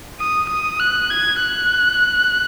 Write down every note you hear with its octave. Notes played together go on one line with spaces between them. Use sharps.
D#6
D#6
F#6
G#6
F#6